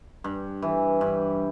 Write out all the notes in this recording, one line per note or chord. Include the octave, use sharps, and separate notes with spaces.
G2
E3
G2